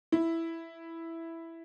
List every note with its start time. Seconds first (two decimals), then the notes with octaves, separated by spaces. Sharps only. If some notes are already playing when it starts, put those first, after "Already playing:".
0.12 E4